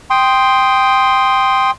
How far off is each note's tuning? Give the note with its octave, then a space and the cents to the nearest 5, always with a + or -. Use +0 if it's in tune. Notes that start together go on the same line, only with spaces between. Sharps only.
G5 +0 C6 +0 D#6 +0